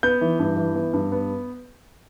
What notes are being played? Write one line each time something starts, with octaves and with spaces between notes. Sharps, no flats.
B3 G6
E3
G2
E3
B3
G2
B3